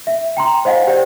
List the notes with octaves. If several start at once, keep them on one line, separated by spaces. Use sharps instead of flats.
E5
G5 A#5 C6
C5 D#5 F5 F#5 G#5
G4 C5 D5 G5